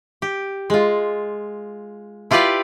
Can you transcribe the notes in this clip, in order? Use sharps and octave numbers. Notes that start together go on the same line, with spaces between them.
G4
G#3 F4
E4 F4 G4 B4 D5 F5